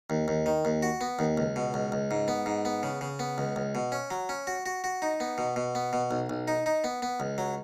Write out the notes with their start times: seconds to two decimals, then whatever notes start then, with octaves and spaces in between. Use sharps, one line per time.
0.10 D#2
0.28 D#2
0.46 D#3
0.65 D#2
0.83 F#4
1.01 B3
1.19 D#2
1.37 C#2
1.56 B2
1.74 C#2
1.92 C#2
2.11 G#2
2.28 B3
2.46 G#2
2.65 B3
2.83 C#3
3.01 C#3
3.19 B3
3.38 C#2
3.56 C#2
3.75 B2
3.92 C#4
4.11 F#3
4.29 C#4
4.47 F#4
4.66 F#4
4.84 F#4
5.02 D#4
5.20 B3
5.38 B2
5.56 B2
5.75 B3
5.93 B2
6.11 B1
6.30 B1
6.48 D#4
6.66 D#4
6.84 B3
7.02 B3
7.20 C#2
7.38 F#3